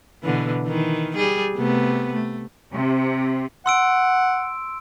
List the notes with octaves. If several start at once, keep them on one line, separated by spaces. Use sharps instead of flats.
B2 D3 E3
D#3 E3
G3 G#4
C3 A3 B3
A3
C3
F#5 C6 E6 D7